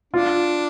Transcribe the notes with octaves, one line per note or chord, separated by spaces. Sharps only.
D4 F4